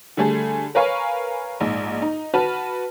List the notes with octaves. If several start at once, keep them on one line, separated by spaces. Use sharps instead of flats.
D3 G3 A3 G#4 A4
A#4 B4 C#5 F5 G#5 C#6
A#1 G#2
D#4
F#4 B4 A5 F6